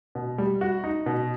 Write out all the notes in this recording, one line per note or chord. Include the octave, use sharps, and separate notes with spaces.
B2
G3
F#4
D#4
B2